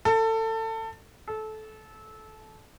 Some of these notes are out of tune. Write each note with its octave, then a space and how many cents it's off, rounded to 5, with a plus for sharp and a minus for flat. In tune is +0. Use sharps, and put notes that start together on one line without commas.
A4 +25
A4 -20